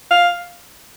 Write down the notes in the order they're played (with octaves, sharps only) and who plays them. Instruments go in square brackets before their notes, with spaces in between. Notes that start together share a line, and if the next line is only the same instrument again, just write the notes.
[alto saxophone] F5